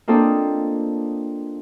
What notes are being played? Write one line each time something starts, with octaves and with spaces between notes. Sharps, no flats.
A#3 C4 D4 F4 A4 D#5